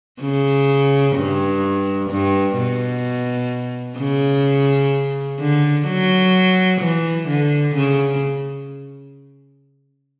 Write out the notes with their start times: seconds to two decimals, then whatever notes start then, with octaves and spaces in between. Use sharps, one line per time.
0.21 C#3
1.16 G2
2.09 G2
2.57 B2
3.98 C#3
5.39 D3
5.87 F#3
6.81 E3
7.28 D3
7.75 C#3